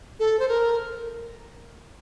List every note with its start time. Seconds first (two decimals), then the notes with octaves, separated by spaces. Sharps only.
0.20 A4
0.39 C5
0.49 A#4